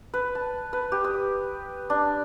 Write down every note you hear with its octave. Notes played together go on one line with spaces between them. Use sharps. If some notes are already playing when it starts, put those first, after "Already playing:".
B4
A5
B4
G4
D#6
D4